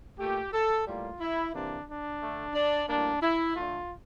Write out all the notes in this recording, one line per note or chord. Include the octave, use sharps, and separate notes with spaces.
A#2 A3 G4
A4
A2 G3 A#3 F4
E4
C3 E3 A#3 D4
D4
D3 A3
D4
A2 G3 A#3 D4
E4
D3 A3 F4